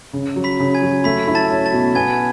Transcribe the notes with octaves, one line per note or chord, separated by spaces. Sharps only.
C#3
F#3
B5 B6
C#3
G#5 G#6
F#3
A3 B5 B6
E4
A5 A6
C#4
A5 A6
B2
B3 G#5 G#6